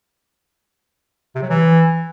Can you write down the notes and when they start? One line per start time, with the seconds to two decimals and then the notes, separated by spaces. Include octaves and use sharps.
1.35 C3
1.42 F#3
1.50 E3